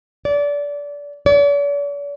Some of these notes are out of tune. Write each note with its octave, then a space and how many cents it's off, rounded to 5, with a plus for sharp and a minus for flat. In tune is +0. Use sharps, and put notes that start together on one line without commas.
D5 -25
D5 -45